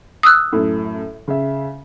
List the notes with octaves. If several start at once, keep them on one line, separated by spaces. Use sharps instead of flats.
D#6 E6 F#6
F#2 A2
C#3 E5